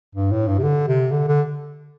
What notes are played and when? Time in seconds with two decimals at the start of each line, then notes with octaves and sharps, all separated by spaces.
0.15 G2
0.32 A2
0.48 G2
0.59 C3
0.63 D3
0.88 C3
1.12 D3
1.28 D3